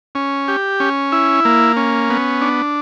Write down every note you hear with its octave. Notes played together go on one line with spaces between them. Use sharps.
C#4
G4
C#4
E4
A#3
C#4
B3
D4